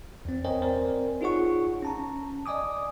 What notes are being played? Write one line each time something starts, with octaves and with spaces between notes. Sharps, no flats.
E2 C4
A#4 C5 C#5 D#5 G5 G#5
C4 A#4 C5 D5 G#5
D#4 F4 G#4 C#5 F#5 C#6
C#4 A5 A#5
D5 D#5 G#5 D6 D#6